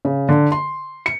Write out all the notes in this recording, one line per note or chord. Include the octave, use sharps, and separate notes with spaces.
C#3
D3
C6
C#7